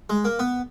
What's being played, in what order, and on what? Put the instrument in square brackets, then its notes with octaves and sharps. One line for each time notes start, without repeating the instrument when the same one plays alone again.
[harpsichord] G#3
A#3
B3